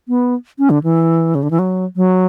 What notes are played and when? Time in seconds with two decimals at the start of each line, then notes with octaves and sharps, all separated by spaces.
0.08 B3
0.58 C#4
0.70 D3
0.84 E3
1.35 C#3
1.43 D3
1.51 E3
1.59 F#3
1.96 F#3